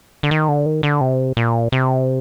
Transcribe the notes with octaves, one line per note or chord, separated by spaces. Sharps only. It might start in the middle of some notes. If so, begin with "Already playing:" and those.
D3
D#3
D3
D#3
D3
C3
A#2
C3